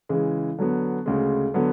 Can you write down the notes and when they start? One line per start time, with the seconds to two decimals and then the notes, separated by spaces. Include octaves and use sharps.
0.09 C#3 E3 G#3
0.58 D3 F#3 B3
1.06 D2 C#3 G#3
1.54 D3 F#3 B3